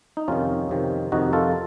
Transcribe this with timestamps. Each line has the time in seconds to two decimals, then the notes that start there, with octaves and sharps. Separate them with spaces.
0.17 D#4
0.28 F2 C3 D#3 C#4 F4
0.69 F2 C3 D#3
1.12 F2 C3 D#3 D#4 F#4
1.33 F4 A4